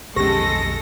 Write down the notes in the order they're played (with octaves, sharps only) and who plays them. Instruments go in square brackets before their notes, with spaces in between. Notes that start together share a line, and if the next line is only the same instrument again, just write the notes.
[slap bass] B1 F2 D#3 [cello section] G#3 A4 [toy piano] C#4 G4 [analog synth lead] A#6